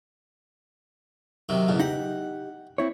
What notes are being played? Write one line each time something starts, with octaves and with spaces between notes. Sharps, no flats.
C3 D#3 F#3
E2 G#2 C#3
D#4 G4 F#5
C4 E4 C#5